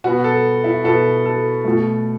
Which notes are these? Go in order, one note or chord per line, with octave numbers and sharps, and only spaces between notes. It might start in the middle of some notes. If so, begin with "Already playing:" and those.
B2 B3 F#4
A4
E4
B2 B3 A4
A4
B2 A3